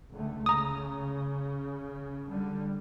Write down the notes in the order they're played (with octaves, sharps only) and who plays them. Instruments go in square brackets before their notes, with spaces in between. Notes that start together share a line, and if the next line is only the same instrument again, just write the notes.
[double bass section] C#2 D3 A3
[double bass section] C#3 [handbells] A#5 D#6
[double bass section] D3 G3